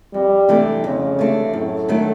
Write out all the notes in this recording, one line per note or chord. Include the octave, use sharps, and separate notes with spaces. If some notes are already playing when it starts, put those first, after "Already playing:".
F2 G3
C3 E3 A3 D4
F2 C#3
C3 E3 A3 D4
F#2 A2
D#3 F#3 A3 D4